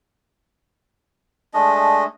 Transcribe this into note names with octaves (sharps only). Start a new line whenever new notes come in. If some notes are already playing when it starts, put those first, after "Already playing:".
G#3 A3 D4 D#5